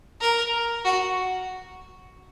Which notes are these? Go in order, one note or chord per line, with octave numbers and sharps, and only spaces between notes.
A#4
F#4